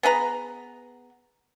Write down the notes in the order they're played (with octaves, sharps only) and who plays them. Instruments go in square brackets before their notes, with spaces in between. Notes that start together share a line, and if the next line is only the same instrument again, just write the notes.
[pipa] B3 G#4 B4 A#5